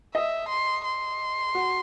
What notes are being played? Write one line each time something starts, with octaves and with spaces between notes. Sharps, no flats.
D#5 E5
C6
C6
F#4